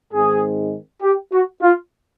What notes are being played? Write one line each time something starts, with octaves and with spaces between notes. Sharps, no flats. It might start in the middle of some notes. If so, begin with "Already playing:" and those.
G#2 D#3 G#3 C4 G#4
G4
F#4
F4